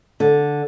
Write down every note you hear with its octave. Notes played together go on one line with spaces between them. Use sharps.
D3